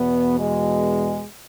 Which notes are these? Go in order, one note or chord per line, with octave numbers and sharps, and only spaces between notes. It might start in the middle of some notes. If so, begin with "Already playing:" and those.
Already playing: E2 B2 B3
G#3